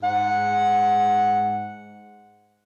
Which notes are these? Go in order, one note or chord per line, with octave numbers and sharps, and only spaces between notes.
G#2 F#5